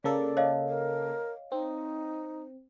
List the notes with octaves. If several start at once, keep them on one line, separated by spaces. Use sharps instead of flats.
C#3 A#3 A4 D5
C#5 D#5 F5
A#4
C4 D#4